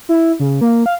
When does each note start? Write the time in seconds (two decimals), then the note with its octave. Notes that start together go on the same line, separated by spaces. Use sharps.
0.09 E4
0.40 C#3
0.61 A#3
0.86 F5